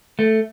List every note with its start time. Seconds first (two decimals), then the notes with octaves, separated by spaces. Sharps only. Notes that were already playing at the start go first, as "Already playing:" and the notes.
0.19 A3